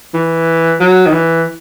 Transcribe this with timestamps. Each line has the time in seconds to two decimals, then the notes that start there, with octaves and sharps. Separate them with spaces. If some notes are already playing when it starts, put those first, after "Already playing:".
0.14 E3
0.80 F#3
1.06 D#3
1.12 E3